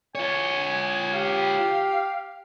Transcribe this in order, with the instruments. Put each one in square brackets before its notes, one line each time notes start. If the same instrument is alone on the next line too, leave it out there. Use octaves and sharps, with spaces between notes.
[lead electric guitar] F4 C#5 [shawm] G#5
[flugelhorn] G4 [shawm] F5